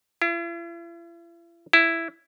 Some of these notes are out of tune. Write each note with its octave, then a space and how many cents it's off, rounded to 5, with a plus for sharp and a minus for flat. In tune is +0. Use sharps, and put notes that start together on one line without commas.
E4 +45
E4 +5